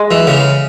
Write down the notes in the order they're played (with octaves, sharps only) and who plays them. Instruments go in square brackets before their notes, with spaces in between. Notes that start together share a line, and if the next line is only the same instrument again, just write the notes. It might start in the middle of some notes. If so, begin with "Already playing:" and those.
Already playing: [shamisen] G#3
[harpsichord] E3
C#3